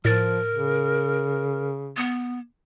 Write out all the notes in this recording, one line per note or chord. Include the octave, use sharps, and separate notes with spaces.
A2 F3 A#4 A6
C#3
B3